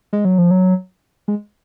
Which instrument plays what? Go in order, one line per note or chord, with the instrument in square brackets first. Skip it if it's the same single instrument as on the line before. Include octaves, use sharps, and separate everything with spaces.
[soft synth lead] G#3
F#3
F3
F#3
G#3